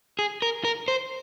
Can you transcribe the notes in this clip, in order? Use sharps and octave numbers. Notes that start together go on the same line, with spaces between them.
G#4
A#4
A#4
C5